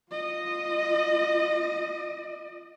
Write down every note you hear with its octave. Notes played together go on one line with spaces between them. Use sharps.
F4 D#5